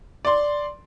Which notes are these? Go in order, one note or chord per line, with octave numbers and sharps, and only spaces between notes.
D5 C6